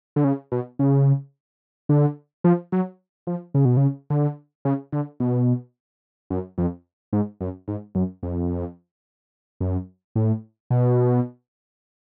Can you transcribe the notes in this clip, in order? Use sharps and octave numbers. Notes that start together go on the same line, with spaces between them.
D3
C#3
B2
C#3
D3
F3
F#3
F3
C#3
B2
C#3
D3
C#3
D3
B2
F#2
F2
G#2
F#2
G#2
F#2
F2
F#2
A2
B2